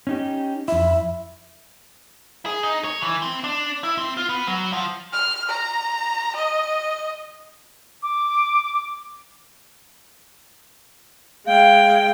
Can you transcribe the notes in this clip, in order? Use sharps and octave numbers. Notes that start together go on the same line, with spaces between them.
C#4 D#4 G4
F2 E4 E5
G#4
D#4
C#5
E3
C4
D4
E4
C4
F4
B3
F#3
F3
F6
A#5
D#5
D6
G#3 F5 G5